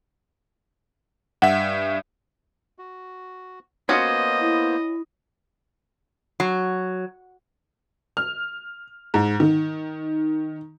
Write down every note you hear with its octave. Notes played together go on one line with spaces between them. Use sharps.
G2 E5 F#5
F#4
A#3 B3 C#4 F4 F#4 C5 D#5
E4
F#3
F6
G#2
D#3